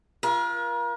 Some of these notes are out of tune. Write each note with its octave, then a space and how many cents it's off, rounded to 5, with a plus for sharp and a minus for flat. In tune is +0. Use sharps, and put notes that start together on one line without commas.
F4 -20 A#4 +40